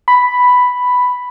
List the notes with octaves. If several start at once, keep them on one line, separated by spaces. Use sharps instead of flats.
B5